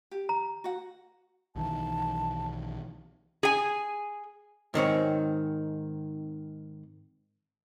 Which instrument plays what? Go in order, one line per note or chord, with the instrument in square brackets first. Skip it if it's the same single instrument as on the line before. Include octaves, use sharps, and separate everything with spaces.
[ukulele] G4
[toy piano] A#5
[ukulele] F#4 F#5
[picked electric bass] B1 D#3 E3 [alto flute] A5
[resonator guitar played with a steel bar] G#4 G#5
[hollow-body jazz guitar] G#2 D#3 C4 C#5